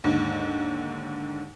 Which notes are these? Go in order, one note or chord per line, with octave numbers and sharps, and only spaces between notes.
D#2 G#2 D3